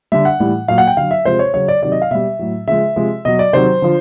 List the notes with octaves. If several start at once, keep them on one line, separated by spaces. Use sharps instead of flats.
D3 G3 E5
F#5
A2 E3 G3
A#2 F#3 F5
F#5
G5
D3 F#3 F5
E5
C3 F3 G#3 C5
C#5
C#3 F#3 C#5
D5
C3 D#3 F#3 D5
D#5
F5
B2 G3 E5
A2 F#3
C#3 F3 G#3 E5
C3 F3 G#3
B2 F#3 D#5
D5
C3 D#3 F#3 C5
D3 F3